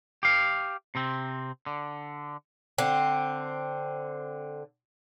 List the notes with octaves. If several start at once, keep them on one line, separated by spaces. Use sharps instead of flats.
G4 F5
C3 C4
D3
D3 C4